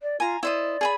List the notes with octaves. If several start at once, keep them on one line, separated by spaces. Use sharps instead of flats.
D5
F4 G#5 A#5
E4 C5 D5 D#5
G#4 G#5 B5